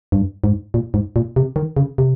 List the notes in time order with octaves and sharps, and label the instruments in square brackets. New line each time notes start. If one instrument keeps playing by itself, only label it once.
[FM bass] G2
G#2
A#2
G#2
A#2
C3
D#3
C#3
C3